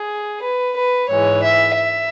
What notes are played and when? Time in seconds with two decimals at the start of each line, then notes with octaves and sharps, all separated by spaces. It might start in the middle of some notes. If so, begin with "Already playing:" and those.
Already playing: G#4
0.43 B4
0.76 B4
1.09 G#2 E3 G#3 C#5
1.42 E5
1.76 E5